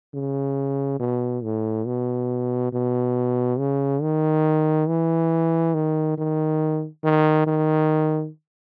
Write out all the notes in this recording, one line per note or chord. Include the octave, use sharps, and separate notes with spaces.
C#3
B2
A2
B2
B2
C#3
D#3
E3
D#3
D#3
D#3
D#3